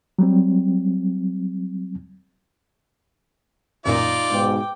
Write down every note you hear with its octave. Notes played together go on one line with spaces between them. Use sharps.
F#3 G3 C4
A1 F#2 A#2 D#4 F4 D5
G#2 B2 G5 D6